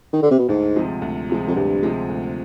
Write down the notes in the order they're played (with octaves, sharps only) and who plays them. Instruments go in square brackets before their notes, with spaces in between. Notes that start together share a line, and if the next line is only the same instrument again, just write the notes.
[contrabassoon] D#3
D3
C3
B2
[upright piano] D2 [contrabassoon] G#2
[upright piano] C3 F3 G#3
D2
C3 F3 G#3
[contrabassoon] F2
[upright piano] D2 [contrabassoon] G2
[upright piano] C3 F3 G#3
D2